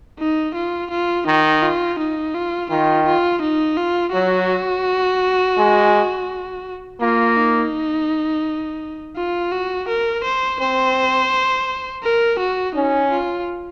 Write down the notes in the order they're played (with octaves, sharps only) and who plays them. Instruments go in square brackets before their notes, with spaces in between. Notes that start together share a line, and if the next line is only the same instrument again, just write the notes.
[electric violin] D#4
F4
F4
[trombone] D#3 [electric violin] D#4
[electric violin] F4
D#4
F4
[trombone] D#3 [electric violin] F4
[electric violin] F4
D#4
F4
[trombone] F#3 [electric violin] F#4
[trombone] G#3
[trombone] A#3 [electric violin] F4
[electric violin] D#4
F4
F#4
A#4
C5
[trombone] C4 [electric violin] C5
[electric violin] A#4
F#4
[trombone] C#4 [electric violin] D#4
[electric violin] F4